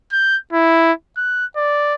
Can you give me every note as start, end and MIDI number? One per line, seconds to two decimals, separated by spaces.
0.12 0.37 91
0.53 0.92 64
1.17 1.46 90
1.56 1.94 74